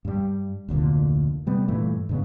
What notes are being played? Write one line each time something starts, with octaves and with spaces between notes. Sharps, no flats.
G2 G3
F1 D2 A#2 D3
C3 G3 B3 C4
G2 A#2 E3 A3
G2 C#3 B3